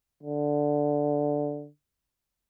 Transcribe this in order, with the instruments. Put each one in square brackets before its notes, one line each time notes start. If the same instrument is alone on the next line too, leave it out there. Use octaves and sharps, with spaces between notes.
[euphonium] D3